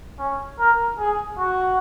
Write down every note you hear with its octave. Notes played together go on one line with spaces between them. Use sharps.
C#4
A#4
G#4
F#4